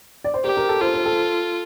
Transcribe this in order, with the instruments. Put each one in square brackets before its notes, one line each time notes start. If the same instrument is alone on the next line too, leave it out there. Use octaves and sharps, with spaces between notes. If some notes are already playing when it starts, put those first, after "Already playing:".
[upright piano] D5
C5
[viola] G4 [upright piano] A#4
[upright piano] A#4
A4
[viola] F4 [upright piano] C5
[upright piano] C5
A4